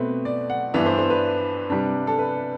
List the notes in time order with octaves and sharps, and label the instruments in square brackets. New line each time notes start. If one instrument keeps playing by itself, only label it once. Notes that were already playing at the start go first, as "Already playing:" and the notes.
Already playing: [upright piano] B2 A3 C4 B4
D5
F#5
G2 E3 B3 D4 E5
C5
C5
B4
C3 G3 D4
A4
B4